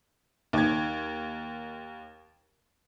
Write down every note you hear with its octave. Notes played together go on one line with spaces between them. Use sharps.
D#2 G#6